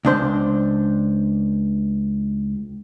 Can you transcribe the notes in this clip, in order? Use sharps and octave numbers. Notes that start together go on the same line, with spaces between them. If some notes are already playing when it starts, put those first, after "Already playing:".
C#2 D4 C5